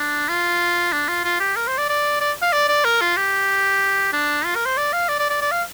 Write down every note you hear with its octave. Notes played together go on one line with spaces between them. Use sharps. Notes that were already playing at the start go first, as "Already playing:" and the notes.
Already playing: D4
F4
D4
F4
F4
G4
A#4
C5
D5
D5
D5
F5
D5
D5
A#4
F4
G4
D4
F4
A#4
C5
D5
F5
D5
D5
D5
D5
F5